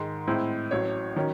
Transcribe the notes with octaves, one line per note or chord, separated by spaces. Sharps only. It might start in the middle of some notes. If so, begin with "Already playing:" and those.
Already playing: G#2 D#3 G#3 C6
A2 G#3 C4 E4
A1 A2 F#3 C#5
D#3 F#3 C#4